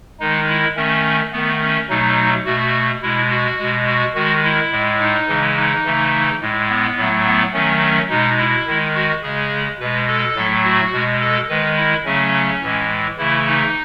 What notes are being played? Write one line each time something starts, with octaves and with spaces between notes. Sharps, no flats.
D#3 G#3 D#4
E4
D#3 A3 C#4
D#3 A3 B3
C#4
B2 F#3 A3 D#4
B2 A3 F#4
B2 G#3 E4
F#4
B2 G#3
F#4
D#3 G#3 F#4
E4
A2 G#3
D#4
C#3 E3 G#3
D#4
C#3 E3 A3
A2 G#3
B3
A2 F#3 A3
B3
D#3 F#3 A3 C#4
C#4
B2 G#3 D#4
E4
D#3 G#3
F#4
C#3 G#3 G#4
B2 G#3 B4
A4
A2 F#3 A3
F#4
B2 G#3
A4
D#3 G#3 B4
E4
C#3 F#3 A3 C#4
A2 E3 G#3
C#3 E3 A3 E4
D#4